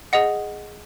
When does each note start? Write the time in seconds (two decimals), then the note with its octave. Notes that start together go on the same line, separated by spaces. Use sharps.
0.13 G#4 D#5 F#5